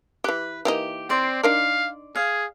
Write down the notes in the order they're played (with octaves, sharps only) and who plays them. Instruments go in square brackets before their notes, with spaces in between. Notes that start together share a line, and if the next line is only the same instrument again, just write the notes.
[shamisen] E3 G4 [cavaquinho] B4
[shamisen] E3 A#3 D#4 [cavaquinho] G4
[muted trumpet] C4 [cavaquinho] D5 C6
[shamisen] D4 D#4 A#4 [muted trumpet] F5
[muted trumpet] G#4 [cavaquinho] F5